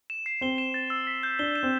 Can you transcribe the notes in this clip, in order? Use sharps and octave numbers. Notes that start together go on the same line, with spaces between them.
E7
C7
C4 G7
E7
A6
E6
B6
G6
D4 G7
E7
C4